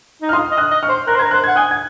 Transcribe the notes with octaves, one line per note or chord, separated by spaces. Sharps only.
D#4
F6
F4 C6 D#6
D#5
D#6 F#6
D#5
C#6 F6
C5
A#4 F#6
C5
A#4 G#6
C5 F#6
F#5 G#6
G#5 D#6 F#6
G#6